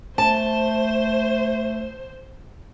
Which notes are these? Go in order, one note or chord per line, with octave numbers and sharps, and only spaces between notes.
A3 C5 A5